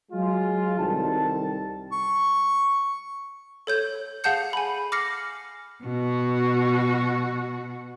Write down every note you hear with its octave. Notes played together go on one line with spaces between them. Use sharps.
F#3 G#3 F4
C2 D#3 A4 A5
C#6
A4 C#5 G6
G#4 F5 F#5 A5 G6 C#7
G#5 B5
D6 F6 A#6 C7 C#7
B2 F#4